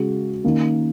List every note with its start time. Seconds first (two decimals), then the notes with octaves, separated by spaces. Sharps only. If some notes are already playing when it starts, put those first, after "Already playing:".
Already playing: C#3 G#3 F#4
0.44 D#3 A#3 C#4